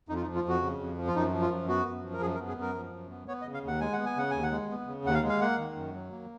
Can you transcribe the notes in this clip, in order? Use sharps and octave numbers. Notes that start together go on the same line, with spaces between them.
F2 D#4
F4
D#4
F3
F4
F2 F#4
C#3
F2
F3
F4
F#2 D#4
F3
F4
F#2
B3 F#4
F#2
F3
A#4
F#2 G#4
A#4
B3
G#4
F#2 A#4
F3
F#2
B3
B3 C#5
D#5
C#3
F5
D#2 F#5
G#3 G#5
F#5
B3
G#5
C#3 F#5
D#2 G#5
F#5
G#3
B3
C#3
D#2 F#5
F5
G#3
F5
A#3 F#5
D#3
F#2
F#3
A#3